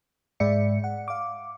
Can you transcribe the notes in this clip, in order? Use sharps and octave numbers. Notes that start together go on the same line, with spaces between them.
G#2 G#3 D5 E5 C#7
F#5
F5 D6